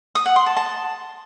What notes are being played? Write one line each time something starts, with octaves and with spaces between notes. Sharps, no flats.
D#6
F#5
C6
A5
A5